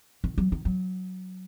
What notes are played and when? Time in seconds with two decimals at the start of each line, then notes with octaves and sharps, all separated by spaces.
0.24 D#3
0.38 F#3
0.52 D#3
0.65 F#3